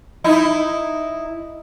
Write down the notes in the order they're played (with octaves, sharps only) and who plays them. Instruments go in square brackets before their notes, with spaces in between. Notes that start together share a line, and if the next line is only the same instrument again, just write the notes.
[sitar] D#4 E4